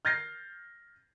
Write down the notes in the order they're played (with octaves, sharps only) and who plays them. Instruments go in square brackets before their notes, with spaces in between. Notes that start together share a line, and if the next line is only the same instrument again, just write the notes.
[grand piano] F6 G6 A6 A#6 C7